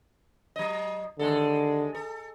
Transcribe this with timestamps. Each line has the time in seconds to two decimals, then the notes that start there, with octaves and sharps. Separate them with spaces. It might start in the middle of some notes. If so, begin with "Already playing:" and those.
0.56 F#3 D#5
1.19 D#2 D3 G#3 A4
1.95 A4